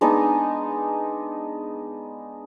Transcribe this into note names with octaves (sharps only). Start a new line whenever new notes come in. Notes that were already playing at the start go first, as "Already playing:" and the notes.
G#3 B3 D4 D#4